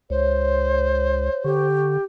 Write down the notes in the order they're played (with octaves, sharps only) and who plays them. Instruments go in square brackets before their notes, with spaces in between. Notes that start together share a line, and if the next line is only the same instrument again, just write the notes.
[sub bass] C#2 [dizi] C5 [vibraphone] C#5
[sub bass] D3 [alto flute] G4 [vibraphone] C#6